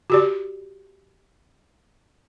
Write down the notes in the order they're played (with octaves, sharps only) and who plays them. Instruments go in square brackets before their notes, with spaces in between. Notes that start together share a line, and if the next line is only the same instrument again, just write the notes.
[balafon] F#4 G4 D5